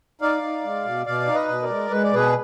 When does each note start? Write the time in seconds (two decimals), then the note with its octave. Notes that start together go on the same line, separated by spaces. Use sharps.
0.21 D#4 D5 F5
0.43 D#4
0.64 G#3
0.85 B2
1.06 B2 D5 F5
1.28 D#4
1.34 B4 D#5
1.48 B2
1.62 A#4 D5
1.70 G#3
1.90 G#3 B4
2.03 D5
2.13 B2 G#4 B4